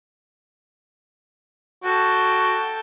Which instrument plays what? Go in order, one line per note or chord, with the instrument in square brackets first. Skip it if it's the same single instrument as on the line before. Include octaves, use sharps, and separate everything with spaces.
[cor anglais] F#4 [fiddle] A4 G5